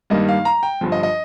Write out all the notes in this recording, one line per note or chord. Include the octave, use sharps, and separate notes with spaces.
G2 D#3 G3 A#3 D#5
F5
A#5
G5
G1 G2 F3
D#5
D#5